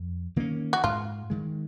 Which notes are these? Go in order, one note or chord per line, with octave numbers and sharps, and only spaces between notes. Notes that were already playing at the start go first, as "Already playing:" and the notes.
Already playing: F2
D#3 A#3 C#4
F#4
G#2 F4
D#3 G#3